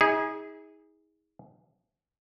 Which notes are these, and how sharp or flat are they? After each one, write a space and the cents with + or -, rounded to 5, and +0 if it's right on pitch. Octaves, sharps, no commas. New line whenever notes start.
D#4 +45 G#4 -15